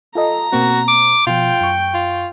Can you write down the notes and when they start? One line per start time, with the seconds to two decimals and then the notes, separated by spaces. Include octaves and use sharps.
0.15 F4 A4 D#5 A#5
0.53 B2 A#3 C4 F#4
0.88 D6
1.27 B2 F3 F4 G5
1.61 F#2 C#6
1.94 F4